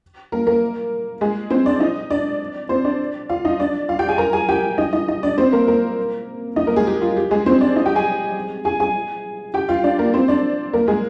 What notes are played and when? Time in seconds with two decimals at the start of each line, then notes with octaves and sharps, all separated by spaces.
0.32 A#3 A#4
0.47 A#3 A#4
1.21 G#3 G#4
1.50 C4 C5
1.66 D4 D5
1.80 D#4 D#5
2.10 D4 D5
2.69 C4 C5
2.84 D4 D5
3.29 F4 F5
3.45 D#4 D#5
3.60 D4 D5
3.89 F4 F5
3.99 G4 G5
4.09 G#4 G#5
4.18 A#4 A#5
4.33 G#4 G#5
4.49 G4 G5
4.78 D#4 D#5
4.93 D#4 D#5
5.08 D#4 D#5
5.23 D4 D5
5.38 C4 C5
5.52 A#3 A#4
5.68 A#3 A#4
6.56 D#4 D#5
6.67 A#3 A#4
6.76 G#3 G#4
6.87 G4
7.02 F4
7.17 G4
7.31 G#3 G#4
7.46 C4 C5
7.61 D4 D5
7.76 D#4 D#5
7.86 G4 G5
7.95 G#4 G#5
8.65 G#4 G#5
8.80 G#4 G#5
9.54 G4 G5
9.69 F4 F5
9.84 D4 D5
9.99 A#3 A#4
10.14 C4 C5
10.28 D4 D5
10.73 A#3 A#4
10.88 G#3 G#4